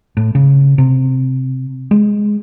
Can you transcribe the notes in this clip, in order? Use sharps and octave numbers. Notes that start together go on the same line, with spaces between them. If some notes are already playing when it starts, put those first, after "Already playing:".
A2
C#3
C3
G#3